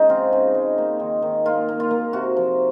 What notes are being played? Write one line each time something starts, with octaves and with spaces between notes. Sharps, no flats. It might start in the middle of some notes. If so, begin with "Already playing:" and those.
Already playing: C#3 G#3 D#4 G#4
C4 F4
C#3
G#3
A#3
D#3
D#3
A#3 F4
A#3
F4
A#3
C3 F#4
F3